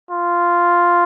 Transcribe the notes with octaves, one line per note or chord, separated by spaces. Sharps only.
F4